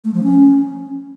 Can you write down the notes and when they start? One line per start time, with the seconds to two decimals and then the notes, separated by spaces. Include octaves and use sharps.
0.04 A3
0.14 F3
0.23 C#4